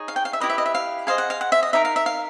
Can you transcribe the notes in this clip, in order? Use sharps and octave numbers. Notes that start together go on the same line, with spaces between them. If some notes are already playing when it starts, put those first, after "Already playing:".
Already playing: D#4 G#4 C#5
F5
G5
F5
E5
E4 G4 B4 D#5
E5
D#5
E5
F5
G#4 C5 D#5 F5
F#5
F5
F#5
E5
D#5
D#4 G4 A#4 E5
F5
E5
F5